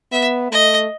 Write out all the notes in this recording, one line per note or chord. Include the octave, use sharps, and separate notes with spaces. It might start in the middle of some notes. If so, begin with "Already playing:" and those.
B3 E5
A3 D#5